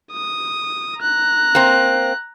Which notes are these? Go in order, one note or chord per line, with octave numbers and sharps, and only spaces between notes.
D#6
A#5 F#6
A#3 C4